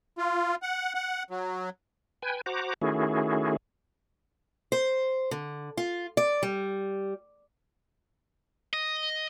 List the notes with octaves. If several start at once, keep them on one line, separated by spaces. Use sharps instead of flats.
F4
F#5
F#5
F#3
B4 G5 G#5
F#4 C5 F#5 A#5 D6
D#3 A3 C#4 E4 F#4 G#4
C5
D3
F4
D5
G3
D#5